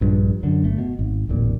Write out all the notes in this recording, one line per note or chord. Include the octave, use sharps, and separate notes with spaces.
A#1 G2
F#2 D3
G1 A3
B2
G#1
D1 A1 A#2